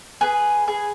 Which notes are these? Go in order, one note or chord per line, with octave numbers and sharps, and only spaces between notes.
G#4 B4
G#4